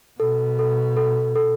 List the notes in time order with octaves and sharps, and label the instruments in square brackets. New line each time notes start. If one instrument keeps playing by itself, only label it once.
[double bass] B2 [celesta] A4
[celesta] A4
A4
A4